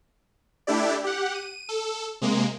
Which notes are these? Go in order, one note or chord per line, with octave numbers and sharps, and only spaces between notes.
A3 D4 E4 G4 D5
G4 F#5
D#7
A4
C3 G#3 A#3